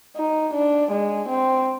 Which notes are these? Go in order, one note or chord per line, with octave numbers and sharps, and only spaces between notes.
D#4
D4
G#3
C4